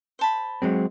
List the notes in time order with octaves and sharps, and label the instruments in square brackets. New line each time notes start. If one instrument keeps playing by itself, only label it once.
[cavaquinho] C5 A5 B5
[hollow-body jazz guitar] F#3 G#3 C4